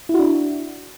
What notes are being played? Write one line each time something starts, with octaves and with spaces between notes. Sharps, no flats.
D4 E4 F#4